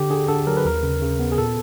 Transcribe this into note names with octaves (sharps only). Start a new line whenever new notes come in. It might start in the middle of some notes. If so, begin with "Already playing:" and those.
Already playing: D3 G4
D3 G#4
D3 A4
F#3 A#4
B4
D#2 A#4
C#3
C#3
B3
G#4
A#2 A4